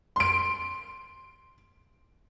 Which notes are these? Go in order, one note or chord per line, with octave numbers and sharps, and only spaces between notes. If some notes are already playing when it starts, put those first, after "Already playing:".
C6 D7